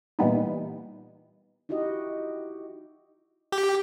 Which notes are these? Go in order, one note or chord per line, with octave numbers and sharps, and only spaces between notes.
A#2 E3 G3 B3 D#4
D#4 E4 F#4 G4 D#5
G4